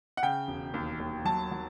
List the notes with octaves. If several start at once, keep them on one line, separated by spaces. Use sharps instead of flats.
F#5
C#3 G5
E1
D#2
D#2
F#3 A5
F#3